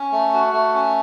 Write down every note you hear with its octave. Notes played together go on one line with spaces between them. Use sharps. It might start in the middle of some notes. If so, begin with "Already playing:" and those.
Already playing: C#4
A3
F#4
A3
C#4